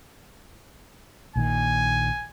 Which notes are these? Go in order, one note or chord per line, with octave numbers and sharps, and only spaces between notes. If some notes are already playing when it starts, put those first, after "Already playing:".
A#1 A#2 D#3 G#5